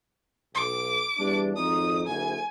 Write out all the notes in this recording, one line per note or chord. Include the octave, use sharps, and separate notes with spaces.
B1 D6
E2 G3 D4
G#1 F2 D#4 D#6
F#1 D2 G#5